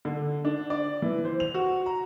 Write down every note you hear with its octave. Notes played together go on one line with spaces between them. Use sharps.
D3
D4
D5
E3
C5
F7
F#4
A#5